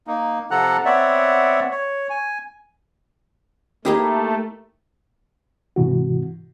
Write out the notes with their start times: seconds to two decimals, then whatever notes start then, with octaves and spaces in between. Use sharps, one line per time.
0.07 A#3 D#4
0.51 C3 F3 A4 F#5 A#5 F#6
0.85 B3 C4 C#5 D5 E5 F#5
1.71 C#5
2.10 G#5
3.85 A3 A#3 D#4 E4 G4 G#4
5.76 G#2 C3 E3 F#4